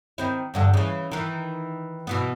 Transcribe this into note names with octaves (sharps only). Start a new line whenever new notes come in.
D#3 C4 E4
E2 G2 D3
C#3 E3
D#3 E3
B2 E3 B3